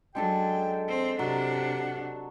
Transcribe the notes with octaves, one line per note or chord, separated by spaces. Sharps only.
F#3 G#3 D4 A4 G5
C4
C3 F#3 D4 F#5